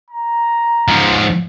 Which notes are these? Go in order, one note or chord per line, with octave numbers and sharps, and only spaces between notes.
A#5
G#2 F3